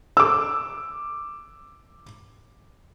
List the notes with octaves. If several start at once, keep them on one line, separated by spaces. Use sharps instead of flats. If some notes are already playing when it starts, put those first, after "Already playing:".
D6 E6